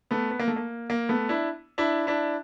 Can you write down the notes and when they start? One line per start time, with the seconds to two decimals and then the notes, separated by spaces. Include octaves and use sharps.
0.11 A3 B3
0.31 B3
0.40 A#3
0.48 A3
0.56 A#3
0.90 A#3
1.09 A3 B3
1.29 D4 E4
1.78 D4 E4
2.07 D4 E4